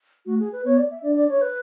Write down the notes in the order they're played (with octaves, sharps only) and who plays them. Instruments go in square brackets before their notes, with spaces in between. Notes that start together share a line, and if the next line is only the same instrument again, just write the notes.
[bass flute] A3 [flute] F#4
[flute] G#4
B4
[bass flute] B3 [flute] C#5
[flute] D5
E5
[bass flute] D4 [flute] D5
[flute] D5
C#5
B4